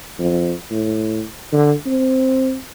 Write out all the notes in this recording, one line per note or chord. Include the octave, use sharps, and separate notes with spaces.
F2
A2
D3
C4